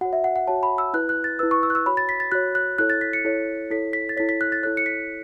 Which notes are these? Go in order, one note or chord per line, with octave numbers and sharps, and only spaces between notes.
F#4 C#5 F#5
E5
F#5
F#5
F#4 C#5 A5
B5
E6
E4 B4 F#6
F#6
A6
E4 B4 E6
C#6
E6
F#6
E6
F#4 C#5 B5
A6
B6
A6
F#4 C#5 F#6
F#6
E4 A4 C#5 F#6
A6
B6
C#7
E4 A4 C#5
E4 A4 C#5 B6
B6
A6
E4 A4 C#5 B6
B6
F#6
A6
E4 A4 C#5 F#6
C#7
B6